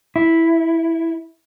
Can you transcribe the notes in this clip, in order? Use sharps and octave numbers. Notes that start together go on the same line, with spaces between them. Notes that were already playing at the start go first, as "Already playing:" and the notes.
E4